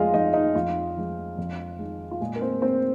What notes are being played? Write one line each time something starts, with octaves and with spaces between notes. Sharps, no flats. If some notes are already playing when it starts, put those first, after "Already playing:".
Already playing: F2 G#3 F4 G#4 D#5 F5
F3 G#3 D#4 D#5
D#4
F2 F4
F3 G#3
F2
D#3 G#3
F4
A#2 G#3 G#4
A#4
C4 C5
G#3 C4 C5